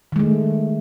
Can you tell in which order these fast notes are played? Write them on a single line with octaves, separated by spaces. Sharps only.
D#3 G#3 A3